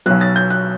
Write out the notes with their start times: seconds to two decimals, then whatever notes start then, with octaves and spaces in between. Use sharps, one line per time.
0.06 B1 B2 F#3 F#6
0.21 A6
0.36 G6
0.50 F#6